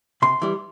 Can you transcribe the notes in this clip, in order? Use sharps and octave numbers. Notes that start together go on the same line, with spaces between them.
C3 C6
E3 G3